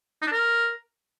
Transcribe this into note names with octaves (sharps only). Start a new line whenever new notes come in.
D#4
D4
A#4